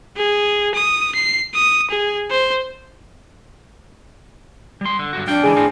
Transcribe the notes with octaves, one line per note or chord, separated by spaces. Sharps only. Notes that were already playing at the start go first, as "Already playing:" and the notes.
G#4
D#6
C7
D#6
G#4
C5
G3 C6
D3
G2 D3 F#4
F2 D4 F5 G5
C#2 E3 G#4
A2 F3 C4